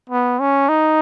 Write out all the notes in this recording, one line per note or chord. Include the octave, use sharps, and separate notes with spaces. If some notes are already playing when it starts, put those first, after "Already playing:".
B3
C#4
D#4